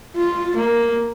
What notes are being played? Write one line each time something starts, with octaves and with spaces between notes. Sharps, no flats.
F4
A#3